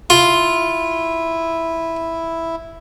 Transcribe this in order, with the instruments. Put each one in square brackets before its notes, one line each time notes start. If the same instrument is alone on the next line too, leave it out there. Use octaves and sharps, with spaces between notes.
[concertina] E4 [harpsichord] F4